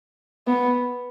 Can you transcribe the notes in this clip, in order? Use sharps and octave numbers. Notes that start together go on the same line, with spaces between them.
B3